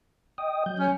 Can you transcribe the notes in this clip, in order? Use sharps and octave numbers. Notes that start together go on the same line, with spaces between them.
D#5 G5 D#6
F#3 G6
C#4